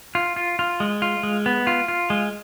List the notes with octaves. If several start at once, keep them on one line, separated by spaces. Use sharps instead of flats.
F4
F4
F4
G#3
F4
G#3
B3
F4
F4
G#3